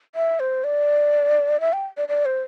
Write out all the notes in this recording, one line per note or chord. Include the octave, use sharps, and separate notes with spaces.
E5
C5
D5
E5
G5
D5
D5
C5